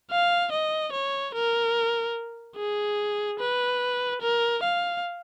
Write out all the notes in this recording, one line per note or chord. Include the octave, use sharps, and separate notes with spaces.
F5
D#5
C#5
A#4
G#4
B4
A#4
F5